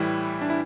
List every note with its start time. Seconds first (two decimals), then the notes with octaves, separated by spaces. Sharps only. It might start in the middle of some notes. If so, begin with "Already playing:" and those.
Already playing: A2 E3 G3 E4
0.41 D4
0.50 E4